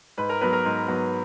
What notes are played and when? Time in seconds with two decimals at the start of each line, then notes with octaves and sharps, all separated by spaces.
0.17 G#2 B4
0.29 A#4
0.41 F#3 B3 B4
0.53 A#4
0.65 G#2
0.88 F#3 B3